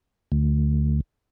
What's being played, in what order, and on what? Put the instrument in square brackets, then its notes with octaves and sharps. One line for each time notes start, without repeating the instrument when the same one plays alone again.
[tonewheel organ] D2